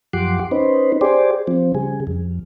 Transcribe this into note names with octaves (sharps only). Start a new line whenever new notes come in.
F#2 F3 G4 F#5 C6 D6
C#4 D#4 B4 C5
G4 G#4 C5 D5
F3 C4
C#3 G3 G#4
F2